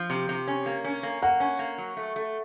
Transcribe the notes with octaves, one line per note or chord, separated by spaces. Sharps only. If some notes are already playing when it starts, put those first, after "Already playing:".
Already playing: F3
C3
C3
C#4
A#3
C#4
A#3
A#3 F#5
C#4
A#3
F#3
A3
A3